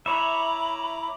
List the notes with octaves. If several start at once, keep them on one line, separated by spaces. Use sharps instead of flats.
E4 C#5 E5 A#5 B5 D6